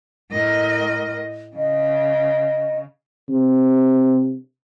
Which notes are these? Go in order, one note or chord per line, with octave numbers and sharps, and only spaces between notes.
A2 A#4 D#5
C#3 D#5
C3